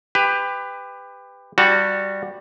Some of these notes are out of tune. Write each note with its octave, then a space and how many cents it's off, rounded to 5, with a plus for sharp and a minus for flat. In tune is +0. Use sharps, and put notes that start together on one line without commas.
G4 +20 B4 +20
G3 +0 F#4 -10 A5 +45